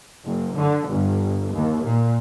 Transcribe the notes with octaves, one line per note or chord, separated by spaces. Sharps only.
F#1
D3
G1
D#2
A#2